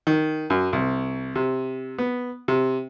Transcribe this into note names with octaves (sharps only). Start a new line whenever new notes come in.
D#3
F#2
C2
C3
B3
C3